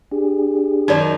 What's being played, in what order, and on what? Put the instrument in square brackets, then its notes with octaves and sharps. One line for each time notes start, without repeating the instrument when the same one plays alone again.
[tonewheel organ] D4 G4 G#4
[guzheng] F#2 D#3 [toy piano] D#4 D5